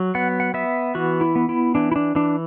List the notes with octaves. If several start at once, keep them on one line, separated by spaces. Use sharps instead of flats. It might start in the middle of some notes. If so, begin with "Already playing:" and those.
Already playing: F#3
B3 F#5
F#5
B3 E5
E3 F#4
E4
B3
E4
E3 D4
E4
D4
E3 D4